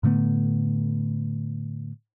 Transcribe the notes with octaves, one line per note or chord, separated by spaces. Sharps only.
A2 D3 A3 B3